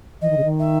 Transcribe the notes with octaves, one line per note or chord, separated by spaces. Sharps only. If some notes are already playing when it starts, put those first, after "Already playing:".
E3 D#5
D#3
C#3
D#3
E5